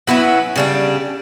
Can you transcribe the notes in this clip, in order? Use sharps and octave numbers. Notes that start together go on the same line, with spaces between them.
F#3 B3 C#4 E4
C#3 G3 D4